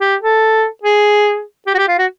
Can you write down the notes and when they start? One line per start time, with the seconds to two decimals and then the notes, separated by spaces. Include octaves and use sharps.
0.01 G4
0.22 A4
0.83 G#4
1.67 G4
1.74 F#4
1.78 G4
1.88 F4
1.98 F#4